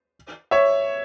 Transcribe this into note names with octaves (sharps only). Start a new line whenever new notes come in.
C#5 E5